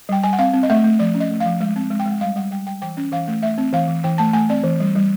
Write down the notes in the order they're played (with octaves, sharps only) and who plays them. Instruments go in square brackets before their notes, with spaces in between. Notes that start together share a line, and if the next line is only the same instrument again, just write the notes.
[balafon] G3 G5
G3 G#5
F#5
C4 F5
C4
D#5
A3 E5
A3
F3 D5
C#4
D#5
A3
F5
F3
G#3
C4
G#3
G5
G#3 F#5
G3 F5
G3 F#5
G3 G5
G3 G5
E3 G5
C#4
E3 F5
A3
A3 E5
C4
E3 F5
E3
E3 G5
A3 A5
A3 G#5
C4 D5
E3
G3
G3